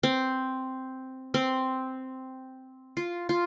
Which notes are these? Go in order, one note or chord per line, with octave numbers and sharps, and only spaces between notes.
C4
C4
F4
F4